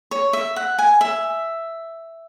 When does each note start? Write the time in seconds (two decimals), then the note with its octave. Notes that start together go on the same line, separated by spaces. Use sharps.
0.11 C#5
0.33 E5
0.56 F#5
0.79 G#5
1.01 E5